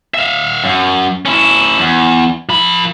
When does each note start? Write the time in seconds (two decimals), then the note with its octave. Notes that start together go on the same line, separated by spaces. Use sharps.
0.14 E5 F5
0.64 F#2
1.26 C#4 E4
1.79 E2
2.49 F3 B5